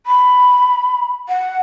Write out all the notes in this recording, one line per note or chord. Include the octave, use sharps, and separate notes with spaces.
B5
F#5